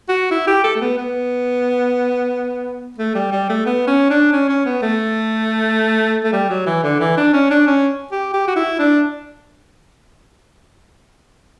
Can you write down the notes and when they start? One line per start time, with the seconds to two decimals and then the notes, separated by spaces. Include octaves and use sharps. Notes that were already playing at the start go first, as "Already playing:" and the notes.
0.09 F#4
0.31 E4
0.47 G4
0.64 A4
0.76 A3
0.81 B3
0.98 B3
2.98 A3
3.15 G3
3.32 G3
3.49 A3
3.66 B3
3.87 C#4
4.10 D4
4.33 C#4
4.49 C#4
4.66 B3
4.82 A3
6.24 A3
6.33 G3
6.50 F#3
6.66 E3
6.83 D3
7.00 E3
7.17 D4
7.33 C#4
7.51 D4
7.67 C#4
8.12 G4
8.34 G4
8.48 F#4
8.56 E4
8.79 D4